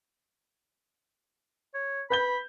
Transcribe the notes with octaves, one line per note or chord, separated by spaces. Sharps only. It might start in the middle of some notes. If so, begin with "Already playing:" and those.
C#5
B4 B5 G6 G7